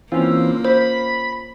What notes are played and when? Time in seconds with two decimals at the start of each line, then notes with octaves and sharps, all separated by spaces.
0.12 E3 A#3 C4 C#4 F4
0.65 C5 B5